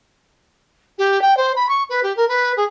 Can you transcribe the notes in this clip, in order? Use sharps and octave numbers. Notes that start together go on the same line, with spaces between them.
G4
G5
C5
B5
C#6
B4
G4
A#4
B4
G#4